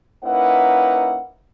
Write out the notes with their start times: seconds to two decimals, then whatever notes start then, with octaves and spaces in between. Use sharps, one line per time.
0.24 A#3 C#4 D#4 E4 B4 F#5